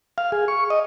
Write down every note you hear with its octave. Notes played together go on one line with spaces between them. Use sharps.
F5
G#4
C#6
D#5